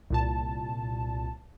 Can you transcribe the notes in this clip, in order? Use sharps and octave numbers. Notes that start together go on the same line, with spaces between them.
C2 A#2 A5